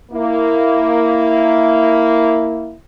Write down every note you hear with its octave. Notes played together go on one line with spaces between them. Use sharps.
A#3 E4